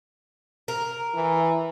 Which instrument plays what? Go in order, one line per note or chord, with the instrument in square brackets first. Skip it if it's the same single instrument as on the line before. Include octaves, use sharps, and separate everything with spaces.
[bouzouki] A#4
[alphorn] E3